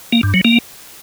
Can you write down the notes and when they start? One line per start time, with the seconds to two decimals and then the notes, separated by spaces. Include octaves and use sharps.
0.12 A#3
0.23 G2
0.34 F#3
0.45 A#3